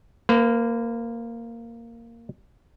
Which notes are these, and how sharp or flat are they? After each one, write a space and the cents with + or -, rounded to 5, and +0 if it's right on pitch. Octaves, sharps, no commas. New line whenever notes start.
A#3 -10 B4 +40